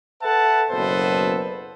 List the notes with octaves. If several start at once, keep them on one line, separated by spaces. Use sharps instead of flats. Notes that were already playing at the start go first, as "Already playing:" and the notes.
A4 B4 E5 F#5 A5
F#1 B2 B3 A4 B4 C5